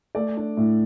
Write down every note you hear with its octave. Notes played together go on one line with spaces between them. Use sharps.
A3 D5
D4
A2